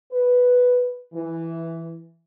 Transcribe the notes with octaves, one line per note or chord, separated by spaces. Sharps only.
B4
E3